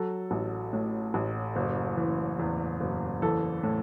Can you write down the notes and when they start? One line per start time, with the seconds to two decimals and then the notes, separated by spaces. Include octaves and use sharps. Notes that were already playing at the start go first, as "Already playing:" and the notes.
Already playing: F#3 A4
0.31 A1
0.73 A2
1.14 A1
1.56 F#1
1.97 E3
2.39 E2
2.80 F#1
3.22 E3 A4
3.63 A2